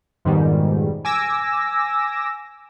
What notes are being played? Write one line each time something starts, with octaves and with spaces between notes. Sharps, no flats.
F2 G#2 B2 D#3 G3
G#5 D6 E6 A#6